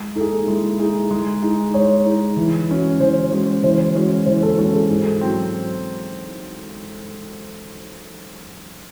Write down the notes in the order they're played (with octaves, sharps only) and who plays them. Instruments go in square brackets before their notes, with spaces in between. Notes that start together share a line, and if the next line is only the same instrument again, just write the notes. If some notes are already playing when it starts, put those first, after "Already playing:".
Already playing: [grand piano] G#3
[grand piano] D#4 [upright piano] A4
[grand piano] G#4
[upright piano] A4
[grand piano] G#3 [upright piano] E4
[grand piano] D#4 G#4
G#3
D#4 G#4
[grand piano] G#3 [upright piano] C#5
[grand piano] D#4 G#4
E3
G#3 C#4 F#4
[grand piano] E3 [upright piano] C5
[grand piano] G#3 C#4 F#4
[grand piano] E3 [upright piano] C5
[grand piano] G#3 C#4 F#4
[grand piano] E3 [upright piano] C5
[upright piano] A4
[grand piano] G#3 C#4 F#4 [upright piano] A4
[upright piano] G#4
[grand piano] G#2 [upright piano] A4
[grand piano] F#3 C4